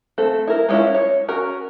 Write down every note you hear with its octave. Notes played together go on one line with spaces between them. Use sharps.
A3 C4 A4
E4 A#4
G#3 B3 C#4 E4 F4
C#5
C#4 F#4 A#4